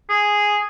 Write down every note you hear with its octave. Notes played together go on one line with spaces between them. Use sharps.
G#4